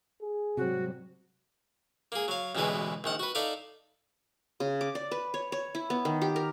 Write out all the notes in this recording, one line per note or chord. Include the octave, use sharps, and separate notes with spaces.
G#4
G#2 C3 F#3 G3 C4 F#4
A#3 G#4
F#3 F5
A1 D2 B2 E3 G#3 B4
A#1 D#3 F#5
F#4 B4
D#4 A4 D5 E5 F5
C#3
D6
D5
B4
C#5
C#5
E4
B3
D#3
G4
A#4